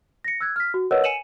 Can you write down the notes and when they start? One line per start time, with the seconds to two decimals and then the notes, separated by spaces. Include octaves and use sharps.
0.24 A#6 C#7
0.41 E6 F#6 G#6
0.56 F6 B6
0.74 F#4
0.91 A#4 B4 C#5 D#5 F#5 E6
1.04 G#5 C#7 D#7 E7 F#7